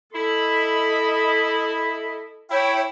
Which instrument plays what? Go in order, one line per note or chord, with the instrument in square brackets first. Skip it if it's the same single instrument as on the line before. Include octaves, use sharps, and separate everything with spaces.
[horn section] E4 B5 [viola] A4 D#5
[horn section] E4 [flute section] C#5 G5